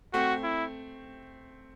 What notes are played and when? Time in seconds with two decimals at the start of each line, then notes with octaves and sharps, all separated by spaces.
0.13 A3 C4 F#4
0.44 E4